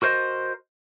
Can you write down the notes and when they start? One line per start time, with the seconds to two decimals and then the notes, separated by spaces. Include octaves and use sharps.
0.02 F#4 A#4 C5 D#5